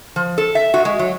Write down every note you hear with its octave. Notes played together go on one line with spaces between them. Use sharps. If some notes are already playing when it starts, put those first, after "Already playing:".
F3
A4
E5
F#4
G#3
F#3